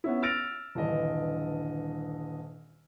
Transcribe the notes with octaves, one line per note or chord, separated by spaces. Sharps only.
B3 C#4 E4
E6 F6 A6 A#6 D7 F7
D#1 G2 D3 E3 D#5